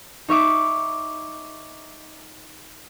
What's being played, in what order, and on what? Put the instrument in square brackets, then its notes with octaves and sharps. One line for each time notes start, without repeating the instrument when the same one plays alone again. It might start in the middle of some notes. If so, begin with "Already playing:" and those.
[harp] D#4 C#5 E5 D6